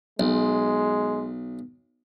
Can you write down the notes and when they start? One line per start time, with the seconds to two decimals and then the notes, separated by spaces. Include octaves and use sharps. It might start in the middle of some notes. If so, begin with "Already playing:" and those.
0.20 B1 G#3